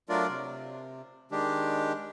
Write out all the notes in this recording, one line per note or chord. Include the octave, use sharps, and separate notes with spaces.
F#3 A3 D4 F4 A#4 D5
C3
D#3 G#3 D4 G4